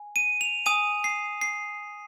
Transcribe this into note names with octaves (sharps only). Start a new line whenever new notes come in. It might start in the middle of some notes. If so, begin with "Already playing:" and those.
Already playing: G#5
D#7
F7
G#5 D#6 D#7
C7
C7